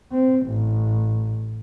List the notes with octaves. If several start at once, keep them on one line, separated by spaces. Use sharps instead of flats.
C4
A1